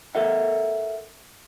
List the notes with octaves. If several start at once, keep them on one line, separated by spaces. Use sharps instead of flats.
A4 A#4 E5 F#5